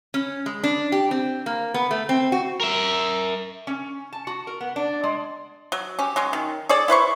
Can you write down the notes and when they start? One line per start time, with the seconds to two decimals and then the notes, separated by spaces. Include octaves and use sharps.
0.14 C#4
0.46 G#3
0.64 D4
0.92 G4
1.11 C4
1.46 A#3
1.74 B3
1.91 A3
2.09 C4
2.32 F#4
2.61 A#4 E5
3.67 C#4
4.13 A5
4.27 F#4
4.47 A#4
4.61 B3
4.76 D4
5.03 G#3
5.72 F#3
5.99 C#4 G4
6.16 F#3 G#3 C#4
6.33 D#3
6.69 G#4 A4 C#5 D5
6.88 E4 B4 C5 C#6